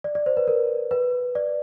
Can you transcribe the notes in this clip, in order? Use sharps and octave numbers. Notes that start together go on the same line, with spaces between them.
D5
D5
C5
B4
A#4
B4
D5